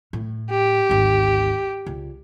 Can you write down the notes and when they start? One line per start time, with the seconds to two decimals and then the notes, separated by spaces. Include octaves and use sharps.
0.13 A2
0.51 G4
0.89 G#1 D2
1.86 C#2